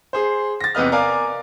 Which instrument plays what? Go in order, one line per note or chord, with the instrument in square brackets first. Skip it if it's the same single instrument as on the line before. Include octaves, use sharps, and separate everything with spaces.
[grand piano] G#4 C5
A6 A#6
E2 C3 B4 D#5 F6
A#4 D5 F5 G#5 D6